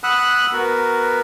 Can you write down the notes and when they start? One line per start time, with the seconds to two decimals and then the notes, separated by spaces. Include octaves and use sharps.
0.03 F#5 B5 D#6 E6 F#6
0.53 B3 F#4 A#4 B4